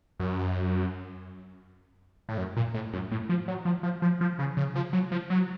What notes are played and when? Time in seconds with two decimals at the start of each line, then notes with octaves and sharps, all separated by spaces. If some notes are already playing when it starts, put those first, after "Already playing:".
0.20 F#2
2.29 A2
2.38 F#2
2.57 A#2
2.74 A2
2.93 F#2
3.11 A2
3.29 F3
3.48 F#3
3.65 F3
3.83 F3
4.02 F3
4.21 F3
4.39 C#3
4.57 C#3
4.76 F3
4.93 F#3
5.12 F3
5.30 F#3